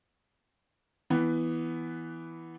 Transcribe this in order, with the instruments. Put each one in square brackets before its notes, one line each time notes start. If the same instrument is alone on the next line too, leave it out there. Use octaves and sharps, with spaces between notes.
[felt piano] E3 B3